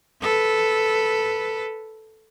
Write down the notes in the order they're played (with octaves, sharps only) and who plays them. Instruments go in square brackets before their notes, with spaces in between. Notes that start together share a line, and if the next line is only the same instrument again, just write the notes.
[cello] A4 B4